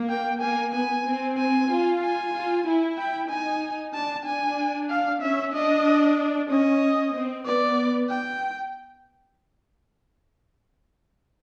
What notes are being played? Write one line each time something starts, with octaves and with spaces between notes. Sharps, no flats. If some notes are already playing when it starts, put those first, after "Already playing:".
Already playing: A#3
G5
A#3 G#5
B3 G#5
C4
G#5
F4
G#5
F4
E4
G5
D#4 G#5
D4 A5
D4 G#5
F5
C#4 E5
D4 D#5
C#4 D#5
C4
B3 D5
G5